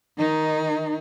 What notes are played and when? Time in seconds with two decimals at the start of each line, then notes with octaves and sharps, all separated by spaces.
0.17 D#3 D#4